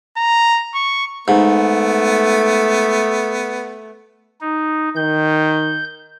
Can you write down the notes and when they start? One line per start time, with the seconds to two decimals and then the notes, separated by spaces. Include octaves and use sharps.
0.17 A#5
0.75 C#6
1.28 G#2 A3 B3
4.41 D#4
4.96 D#3 G6